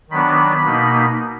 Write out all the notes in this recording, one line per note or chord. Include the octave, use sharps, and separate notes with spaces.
D#3 F#3 B3 D4 B5
B2 A#3 D#4